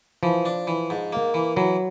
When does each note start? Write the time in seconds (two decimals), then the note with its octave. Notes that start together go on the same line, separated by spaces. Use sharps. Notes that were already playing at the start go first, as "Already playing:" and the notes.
0.23 E3 F3
0.45 D4
0.67 E3
0.90 G#2
1.13 A#3
1.34 E3
1.57 E3 F#3